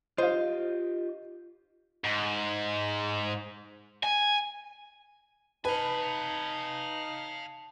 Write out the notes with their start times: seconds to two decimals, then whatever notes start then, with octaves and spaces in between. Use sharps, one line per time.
0.18 F4 G4 C5 D#5 F5
2.04 G#2
4.03 G#5
5.65 D#4 B4 F5 G#5 A5